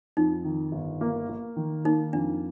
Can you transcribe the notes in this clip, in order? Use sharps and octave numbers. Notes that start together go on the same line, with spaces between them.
F2 D#4
D#3
G1
A#3
A#3
D#3
A#3 D#4
F2 D4